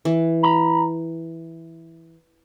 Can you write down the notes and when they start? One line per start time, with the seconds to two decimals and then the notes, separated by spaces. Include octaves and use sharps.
0.05 E3
0.43 A#5 B5